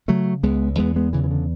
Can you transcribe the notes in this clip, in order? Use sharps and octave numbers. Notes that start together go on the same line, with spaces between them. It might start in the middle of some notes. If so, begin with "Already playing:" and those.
C#3 F#3 A3
C#2 G#3 B3
E2 G#3 B3
G#3 B3
C#3 E3
E3
D3